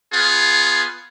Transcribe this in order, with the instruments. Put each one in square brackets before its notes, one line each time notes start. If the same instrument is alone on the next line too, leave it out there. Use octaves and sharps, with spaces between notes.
[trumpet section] B3 F4 G#4